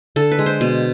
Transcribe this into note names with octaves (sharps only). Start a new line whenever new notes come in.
D3 A4
B4
G#3
C5
B2